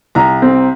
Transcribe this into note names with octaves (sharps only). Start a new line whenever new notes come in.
C2 A#5
C4